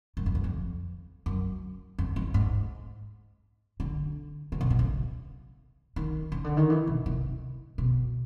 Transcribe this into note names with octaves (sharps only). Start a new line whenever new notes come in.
F#2
F2
G2
F2
F#2
F2
F2
G#2
D3
C#3
C3
B2
C#3
D#3
C#3
D3
D#3
E3
B2
C3
B2